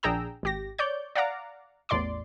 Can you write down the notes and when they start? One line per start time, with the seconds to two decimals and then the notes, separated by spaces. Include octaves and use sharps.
0.03 A#1 D4 G#4 G5 A#5 E6
0.43 G#1 G4 A#6
0.78 C#5 D5 G6
1.15 D5 F5 F#5 A#5 D6
1.89 A1 E2 A2 D5 C6 D6